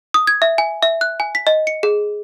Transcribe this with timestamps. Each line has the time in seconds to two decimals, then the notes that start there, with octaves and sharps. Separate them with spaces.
0.14 D#6
0.27 G#6
0.42 E5
0.58 G#5
0.83 E5
1.01 F#6
1.20 G#5
1.35 B6
1.47 D#5
1.67 C#7
1.83 G#4